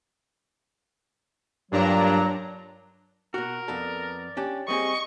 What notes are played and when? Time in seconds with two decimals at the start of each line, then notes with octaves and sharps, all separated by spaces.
1.72 G2 A#2 F#3 D4 A#5
3.34 B2 F#4 A#4 F#5
3.68 F2 B3 A4 D5
4.37 C#4 D4 G4
4.68 G3 C4 G#4 D#5 C#6